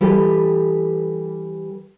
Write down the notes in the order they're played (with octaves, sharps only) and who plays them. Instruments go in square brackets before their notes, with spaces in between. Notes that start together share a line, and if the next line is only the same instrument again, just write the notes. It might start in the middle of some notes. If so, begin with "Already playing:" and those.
[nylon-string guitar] E3 G3 G4 A4 B4